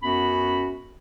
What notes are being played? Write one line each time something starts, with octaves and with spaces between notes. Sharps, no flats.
F#2 B3 C#4 F#4 B5